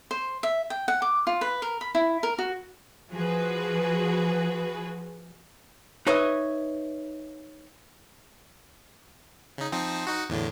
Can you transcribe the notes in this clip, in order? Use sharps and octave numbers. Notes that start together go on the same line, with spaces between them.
C5
E5
G5
F#5
D6
F4
B4
A#4
B5
E4
A#4
F#4
F3 F#4 G#4 B4
D#4 B4 C#5 D#5 E5
C#3 D#4
F3 C4 D#4
D#4 F#4
E2 A2 D3